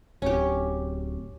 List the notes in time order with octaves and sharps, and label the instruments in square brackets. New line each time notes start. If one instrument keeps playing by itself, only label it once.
[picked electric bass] D1 [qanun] C#4 G4